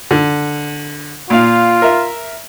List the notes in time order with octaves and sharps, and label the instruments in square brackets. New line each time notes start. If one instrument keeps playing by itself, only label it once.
[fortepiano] D3
[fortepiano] A#2 F5 [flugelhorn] F4
[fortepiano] A#4 E5